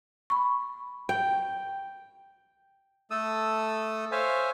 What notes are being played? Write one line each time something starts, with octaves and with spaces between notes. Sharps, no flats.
B5 C#6
G5
A3 A4 D#6 E6
C5 C#5 E5 F5 G#5